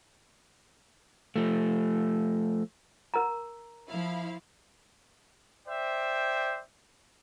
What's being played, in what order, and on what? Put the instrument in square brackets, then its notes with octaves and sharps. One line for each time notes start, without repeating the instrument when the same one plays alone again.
[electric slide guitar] F3 A3
[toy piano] A#4 A#5
[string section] F3 E4 F5
[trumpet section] C5 D5 E5 G5